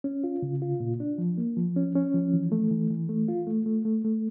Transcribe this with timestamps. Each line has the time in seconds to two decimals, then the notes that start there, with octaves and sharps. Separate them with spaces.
0.04 C#4
0.24 F4
0.42 C#3
0.62 F4
0.80 A#2
1.00 D4
1.18 F3
1.38 A#3
1.57 F3
1.76 C#4
1.95 C#4
2.14 F3
2.33 E3
2.52 A3
2.71 E3
2.90 E3
3.09 A3
3.28 F4
3.47 A3
3.66 A3
3.85 A3
4.05 A3